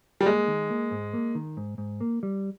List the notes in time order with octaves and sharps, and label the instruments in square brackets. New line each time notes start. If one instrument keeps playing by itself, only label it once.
[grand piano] G3
[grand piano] G#3 [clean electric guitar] A#3
[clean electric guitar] D#3
A#3
G#2
A#3
D#3
G#2
G#2
A#3
G3